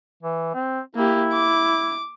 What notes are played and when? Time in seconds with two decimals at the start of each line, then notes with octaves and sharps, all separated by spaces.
0.23 E3
0.55 C4
0.95 A#3 E4 G4
1.33 D6